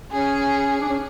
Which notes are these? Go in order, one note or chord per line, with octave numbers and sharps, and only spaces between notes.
C#4 G#4
D4
C#4